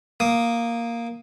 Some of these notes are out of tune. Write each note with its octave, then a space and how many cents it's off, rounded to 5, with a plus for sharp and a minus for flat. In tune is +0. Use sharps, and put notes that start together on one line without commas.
A#3 +0 D#6 +0